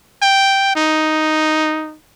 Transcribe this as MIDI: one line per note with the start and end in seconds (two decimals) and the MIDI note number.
0.22 0.71 79
0.76 1.96 63